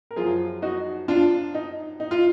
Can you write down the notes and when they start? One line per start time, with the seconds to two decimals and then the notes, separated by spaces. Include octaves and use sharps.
0.11 A#4
0.16 F#2 F3 F4 G#4
0.62 D#4 F#4
1.08 D4 F4
1.55 D#4
2.00 D#4
2.11 F4